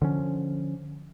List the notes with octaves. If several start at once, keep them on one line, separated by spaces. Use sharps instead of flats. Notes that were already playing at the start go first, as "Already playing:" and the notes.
D3 F3 C#4